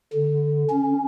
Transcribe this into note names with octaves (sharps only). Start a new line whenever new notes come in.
D3
C#4